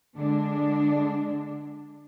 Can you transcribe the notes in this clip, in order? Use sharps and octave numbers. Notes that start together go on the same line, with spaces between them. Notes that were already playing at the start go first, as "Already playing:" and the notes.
D3 G#3 D4